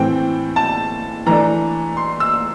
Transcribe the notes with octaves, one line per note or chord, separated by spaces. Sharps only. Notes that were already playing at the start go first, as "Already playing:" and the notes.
Already playing: A2 E3 A3 C4 G5
A5
E3 A3 D4 A#5
C6
E6